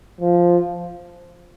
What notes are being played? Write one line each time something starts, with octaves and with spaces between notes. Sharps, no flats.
F3